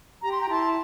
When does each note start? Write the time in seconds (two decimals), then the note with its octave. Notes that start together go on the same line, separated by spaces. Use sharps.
0.21 G4 A#5
0.31 C6
0.39 G5 A#5
0.49 E4 A5 C6